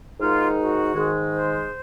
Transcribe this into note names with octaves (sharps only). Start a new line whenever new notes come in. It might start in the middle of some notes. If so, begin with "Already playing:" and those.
G#2 D#3 G#3 D#4 F4
F#4
G#2 D#3 G#3
C5